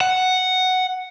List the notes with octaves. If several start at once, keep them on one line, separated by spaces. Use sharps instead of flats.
F#5